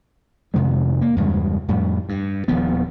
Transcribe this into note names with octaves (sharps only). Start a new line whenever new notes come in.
F2 C3 D#3 G#3
A#3
E2 G2 C#3 G#3
F2 A2 G3
G2
D#1 D#2 F3 B3